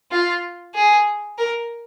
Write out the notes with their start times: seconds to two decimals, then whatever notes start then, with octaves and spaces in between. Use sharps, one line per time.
0.12 F4
0.75 G#4
1.38 A#4